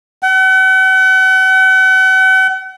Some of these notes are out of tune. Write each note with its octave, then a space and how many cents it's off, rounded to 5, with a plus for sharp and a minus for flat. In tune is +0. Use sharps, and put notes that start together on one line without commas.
F#5 +40